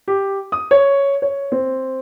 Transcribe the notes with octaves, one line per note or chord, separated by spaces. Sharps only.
G4
D#6
C#5
C#5
C4